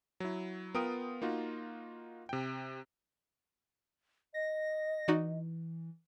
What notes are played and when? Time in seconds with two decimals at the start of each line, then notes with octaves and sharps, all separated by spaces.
0.20 F#3 E4
0.75 B3 F4 A#4 G5 D#6 D7
1.22 A#3 D#4 F4 F#4
2.29 C3 G5
4.34 D#5 A#6
5.08 E3 D#4 F#4 D5